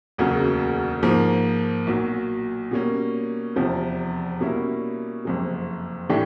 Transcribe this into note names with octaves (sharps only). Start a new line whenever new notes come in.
E1 D2 C#3 F#3 A#3
G#2 F3 A#3
B1 A#2 F#3
B2 G3 A#3 C#4
F1 E2 C3 F3
B2 G3 A#3 C#4 E4
F#1 F2 C3
A2 E3 A3 D4 G4